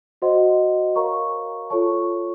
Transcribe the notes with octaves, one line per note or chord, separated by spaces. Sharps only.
F#4 C5 D#5 F#5 C6
A#4 C#5 F5 A#5 C#6
F4 A4 C#5 A5 C#6